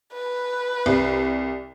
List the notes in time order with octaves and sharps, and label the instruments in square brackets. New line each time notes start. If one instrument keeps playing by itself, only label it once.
[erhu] B4
[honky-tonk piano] C2